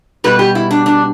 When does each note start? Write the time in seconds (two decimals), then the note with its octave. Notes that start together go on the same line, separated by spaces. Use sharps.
0.24 B2 G3 B4
0.39 G4
0.55 E4
0.71 D4
0.86 D4